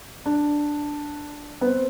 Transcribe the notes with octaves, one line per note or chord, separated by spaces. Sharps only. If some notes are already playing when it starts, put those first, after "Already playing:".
D4
B3
C4